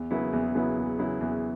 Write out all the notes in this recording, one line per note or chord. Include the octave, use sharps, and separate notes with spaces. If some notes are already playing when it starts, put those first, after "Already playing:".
Already playing: E2
C#3 F#3 B3 E4
E2
C#3 F#3 B3 E4
E2
C#3 F#3 B3 E4
E2